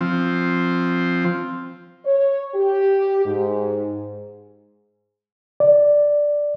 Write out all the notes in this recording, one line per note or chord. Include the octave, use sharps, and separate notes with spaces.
F3 C4
C#5
G4
G#2
D5